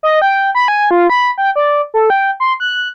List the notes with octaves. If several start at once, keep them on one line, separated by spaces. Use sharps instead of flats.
D#5
G5
B5
G#5
F4
B5
G5
D5
A4
G5
C6
F#6